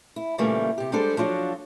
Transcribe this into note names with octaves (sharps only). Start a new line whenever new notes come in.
E4
A#2 C#3 E3 G3 A3 A#3
C3 G4
G3 G#3 D4 G4 A4 C5
F3 F#3 D4 F4 F#4